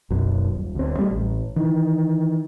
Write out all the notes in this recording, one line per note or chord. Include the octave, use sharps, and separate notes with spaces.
F#1 B1 F#2
D#1
D2 C4
G3 A3
A1
D#3 E3